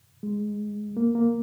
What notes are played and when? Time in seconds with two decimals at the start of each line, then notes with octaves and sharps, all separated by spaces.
0.23 G#3
0.97 A#3
1.15 A#3